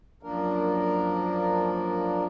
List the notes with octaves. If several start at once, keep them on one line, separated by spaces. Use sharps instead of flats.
F#2 F3 A#3 D4 A#4